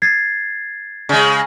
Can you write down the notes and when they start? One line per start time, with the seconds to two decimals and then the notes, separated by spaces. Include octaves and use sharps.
0.02 G#6 A6 C7
1.09 C#3 G#3